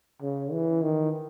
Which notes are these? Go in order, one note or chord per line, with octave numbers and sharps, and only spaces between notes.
C#3
E3
D#3